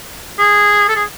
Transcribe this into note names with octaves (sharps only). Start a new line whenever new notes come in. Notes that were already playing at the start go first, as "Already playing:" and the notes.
G#4
A4
G#4